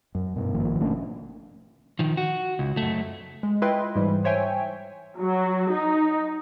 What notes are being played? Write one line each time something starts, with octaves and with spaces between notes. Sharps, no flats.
F#2
G2 B2
G#1 D#3 F3 A#3
B2 A3 C#4 D4
D#3 F3
F#4
C#2
F#2 A3
G#3
E4 F4 B4 D#5 G5 C6
G#2 E3 G3
C5 C#5 E5 G5 G#5
F#3
D#4